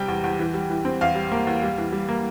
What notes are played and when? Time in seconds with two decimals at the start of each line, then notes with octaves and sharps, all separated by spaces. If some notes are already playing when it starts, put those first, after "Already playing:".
Already playing: C3 G3 G5
0.08 E2
0.24 E2
0.39 E3
0.54 G3
0.70 E3
0.85 C4
1.01 E2 F5
1.15 G3
1.32 A#3
1.47 E2
1.63 G3
1.78 E3
1.92 G3
2.09 A#3